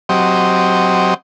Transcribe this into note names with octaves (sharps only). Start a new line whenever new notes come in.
F#3 C4 G4 D#5